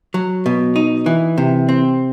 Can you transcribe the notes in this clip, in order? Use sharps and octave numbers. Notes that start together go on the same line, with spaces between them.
F#3
B2
D#4
E3
C3
C4